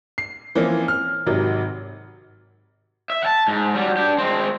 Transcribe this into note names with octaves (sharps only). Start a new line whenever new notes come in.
C7
E3 F3 A#3 C4 C#4
F6
G#1 C3 D#3 F#3
E5
F#5 A5
G#2
F#3 G3
D4 G4
G#3 C4